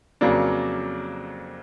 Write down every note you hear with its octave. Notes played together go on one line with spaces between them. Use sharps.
F2 C#3 F#3 A#3 D4